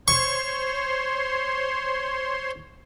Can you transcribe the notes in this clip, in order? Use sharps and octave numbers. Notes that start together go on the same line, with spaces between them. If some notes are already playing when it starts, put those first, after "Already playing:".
C5 C#5 C6 C#6